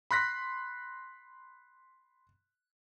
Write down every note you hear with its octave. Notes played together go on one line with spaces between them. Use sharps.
B5 C6 F#6 A#6 B6